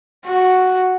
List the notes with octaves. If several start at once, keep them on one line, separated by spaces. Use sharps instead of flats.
F#4